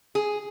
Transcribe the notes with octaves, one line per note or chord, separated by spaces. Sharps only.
G#4